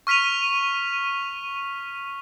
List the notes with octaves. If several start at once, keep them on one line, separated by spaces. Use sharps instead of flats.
C#6 F6 B6 D#7 F7